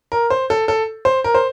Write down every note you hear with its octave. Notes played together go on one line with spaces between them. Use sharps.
A#4
C5
A4
A4
C5
A#4
C5